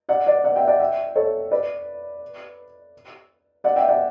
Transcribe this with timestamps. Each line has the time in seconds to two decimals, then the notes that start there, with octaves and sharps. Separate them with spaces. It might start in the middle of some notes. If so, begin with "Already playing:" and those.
0.09 D5 F#5
0.26 D5 F#5
0.44 D5 F#5
0.56 E5 G5
0.67 D5 F#5
0.80 E5 G5
1.16 A4 C#5
1.51 B4 D5
3.64 D5 F#5
3.76 E5 G5
3.89 D5 F#5